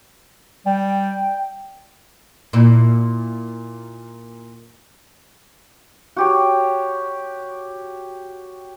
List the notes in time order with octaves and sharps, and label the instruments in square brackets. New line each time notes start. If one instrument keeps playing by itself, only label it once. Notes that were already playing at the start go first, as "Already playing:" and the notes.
[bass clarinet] G3 [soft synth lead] G5
[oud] A#2 E4
[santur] F#4 G4 C#5